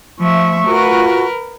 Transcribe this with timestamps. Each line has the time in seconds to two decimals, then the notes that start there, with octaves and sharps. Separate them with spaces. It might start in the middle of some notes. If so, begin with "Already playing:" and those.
0.19 F3 A3 E5 C#6
0.68 F4 F#4 A#4 B4